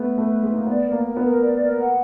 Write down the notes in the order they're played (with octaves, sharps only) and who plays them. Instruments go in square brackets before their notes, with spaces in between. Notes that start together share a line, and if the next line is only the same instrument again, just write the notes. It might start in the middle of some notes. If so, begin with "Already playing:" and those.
Already playing: [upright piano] A3 B3
[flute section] B4
[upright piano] A3
[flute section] B4
[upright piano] G#3
[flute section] D#4
[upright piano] A#3
[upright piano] B3 [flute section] D5
[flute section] A#4
[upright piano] A#3
[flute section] A#4
[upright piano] B3
[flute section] A#4
D5
A#4
F#5